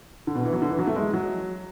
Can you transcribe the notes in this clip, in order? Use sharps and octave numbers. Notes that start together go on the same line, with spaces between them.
D3
B2
E3
F#3
D3
E3
F#3
A3
G#3
F#3